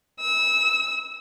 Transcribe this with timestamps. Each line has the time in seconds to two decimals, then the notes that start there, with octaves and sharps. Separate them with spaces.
0.20 E6